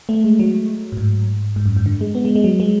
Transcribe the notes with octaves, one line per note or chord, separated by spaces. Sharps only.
A3
G#3
F#3
A2
G#2
G#2
F#2
G#2
D3
G#3
B3
G#3
G#3
F#3
G#3